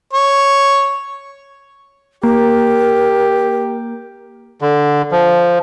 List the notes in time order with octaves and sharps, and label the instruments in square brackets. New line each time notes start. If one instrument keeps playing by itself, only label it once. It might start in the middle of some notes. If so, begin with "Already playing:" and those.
[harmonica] C#5
[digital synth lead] A#3 [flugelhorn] G4 [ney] A#4
[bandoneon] D3
F3